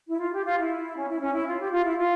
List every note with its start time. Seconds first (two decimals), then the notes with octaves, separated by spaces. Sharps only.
0.10 E4
0.20 F4
0.33 G4
0.45 F4
0.58 E4
0.97 C#4
1.08 E4
1.21 C#4
1.34 E4
1.47 F4
1.60 G4
1.73 F4
1.84 E4
1.97 F4